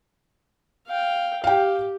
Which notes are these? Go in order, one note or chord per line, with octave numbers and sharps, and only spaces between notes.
F5 G5
G4 F5 G5